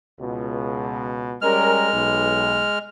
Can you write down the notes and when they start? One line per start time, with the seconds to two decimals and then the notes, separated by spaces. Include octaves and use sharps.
0.18 C#2 B2
1.42 G3 G#3 C#4 A#4 F6
1.92 B1